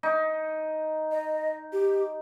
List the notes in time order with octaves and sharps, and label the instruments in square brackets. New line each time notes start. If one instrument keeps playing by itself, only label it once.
[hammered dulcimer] D#4
[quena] D#5
G4